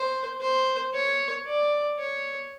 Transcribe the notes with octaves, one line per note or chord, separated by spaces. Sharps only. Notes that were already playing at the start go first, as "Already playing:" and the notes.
Already playing: C5
C5
C#5
D5
C#5